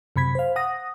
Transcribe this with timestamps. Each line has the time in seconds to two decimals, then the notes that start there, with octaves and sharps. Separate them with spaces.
0.16 F#2 C3 B5 G#6 B6
0.35 C5 F5
0.56 F#5 D#6 A#6